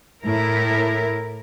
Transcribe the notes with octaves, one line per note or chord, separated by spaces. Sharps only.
A2 E4 A#4